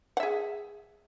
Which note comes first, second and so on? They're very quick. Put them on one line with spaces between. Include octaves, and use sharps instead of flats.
F#5 E5 G#4